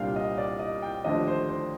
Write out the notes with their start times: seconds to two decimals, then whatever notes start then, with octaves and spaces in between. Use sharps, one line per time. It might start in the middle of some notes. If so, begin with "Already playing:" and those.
Already playing: C2 A#2 G3 D4 F4 F5 G5
0.16 D#5
0.38 D5
0.59 D#5
0.82 G5
1.04 D#2 D3 F3 A3 D4 D#5
1.28 C5
1.49 C5